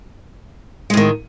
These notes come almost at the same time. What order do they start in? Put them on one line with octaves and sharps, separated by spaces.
G#3 A2 D#3